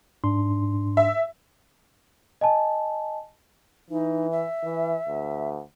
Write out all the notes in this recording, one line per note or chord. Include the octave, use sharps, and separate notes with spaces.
G#2 D4 C6
E5
D#5 G#5 A5
E3 D#4
E5
E3
D2